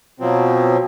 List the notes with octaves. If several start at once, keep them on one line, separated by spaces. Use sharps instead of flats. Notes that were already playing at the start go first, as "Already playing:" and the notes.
B2 F3 F#3 C4